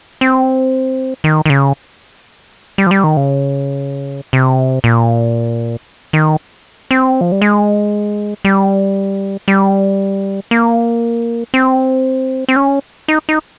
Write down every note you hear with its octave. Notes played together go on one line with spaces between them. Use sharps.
C4
D#3
D#3
C#3
G3
F3
G3
D#3
C#3
C3
A#2
D#3
C4
F3
G3
G#3
G3
G3
A#3
C4
C4
C#4
D#4
D#4